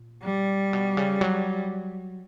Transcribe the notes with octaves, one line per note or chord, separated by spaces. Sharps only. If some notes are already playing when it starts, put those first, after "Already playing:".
Already playing: A#2
G3
B2
C#3
F#3